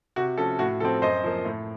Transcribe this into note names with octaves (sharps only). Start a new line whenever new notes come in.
C3 F#4
F3 A3 C#4 A4
A2 F#4
F3 C4 A4
F#2 C5 D#5
F3 A#3
A2